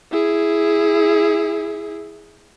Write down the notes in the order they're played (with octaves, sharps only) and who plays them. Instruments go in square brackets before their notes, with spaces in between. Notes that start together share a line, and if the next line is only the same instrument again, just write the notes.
[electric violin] E4 G#4